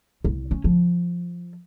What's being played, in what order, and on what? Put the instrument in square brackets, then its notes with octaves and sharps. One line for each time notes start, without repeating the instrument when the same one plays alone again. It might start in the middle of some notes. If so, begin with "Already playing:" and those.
[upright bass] C2
C#4
F3